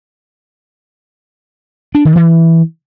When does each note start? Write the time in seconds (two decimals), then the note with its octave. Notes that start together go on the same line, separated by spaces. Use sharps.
1.95 D4
2.05 D#3
2.16 E3